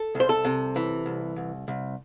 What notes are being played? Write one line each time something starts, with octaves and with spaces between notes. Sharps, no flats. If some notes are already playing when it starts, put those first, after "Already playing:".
Already playing: A4
C2
C5
A4
C3
E3
C2
C2
C2